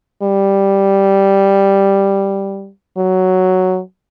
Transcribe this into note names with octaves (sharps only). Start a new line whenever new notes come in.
G3
F#3